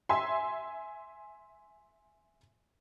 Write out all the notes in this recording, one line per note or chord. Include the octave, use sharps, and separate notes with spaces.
E5 G#5 C6